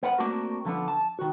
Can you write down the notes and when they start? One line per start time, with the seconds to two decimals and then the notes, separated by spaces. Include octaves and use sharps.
0.03 B3 A#4 F#5
0.18 A3 A#3 C4 D4 F#4 A#4
0.65 D3 F3 B3 D4
0.88 A5
1.19 D#3 F#4